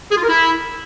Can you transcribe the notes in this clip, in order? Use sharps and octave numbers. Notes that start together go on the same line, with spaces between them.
G#4
F4
A#4
E4